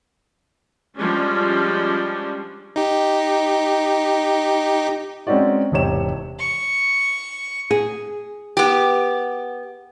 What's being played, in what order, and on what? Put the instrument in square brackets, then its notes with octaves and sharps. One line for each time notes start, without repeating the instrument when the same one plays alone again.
[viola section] F3 G3 G#3 C#4 D4
[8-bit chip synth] D#4 G4
[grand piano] G#3 C4 C#4 D#4 F#4 D5
E1 G#2 C3 C#5 E7
[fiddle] C#6
[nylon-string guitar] G#4
[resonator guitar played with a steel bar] B3 G4